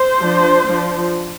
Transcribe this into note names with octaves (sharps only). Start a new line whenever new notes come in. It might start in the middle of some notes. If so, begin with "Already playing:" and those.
Already playing: C5
F3 D4
F3 D4